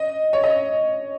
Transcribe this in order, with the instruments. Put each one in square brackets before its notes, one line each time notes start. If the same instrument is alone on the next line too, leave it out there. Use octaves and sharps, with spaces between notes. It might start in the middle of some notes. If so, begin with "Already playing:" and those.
Already playing: [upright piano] D#5
C#5
D#5